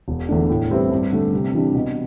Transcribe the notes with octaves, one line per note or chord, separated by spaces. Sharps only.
E1
E2 D3 A3 D4
A2
G3 C4 E4 B4
G2
D3 A3
C3
E3 G3 D4
B2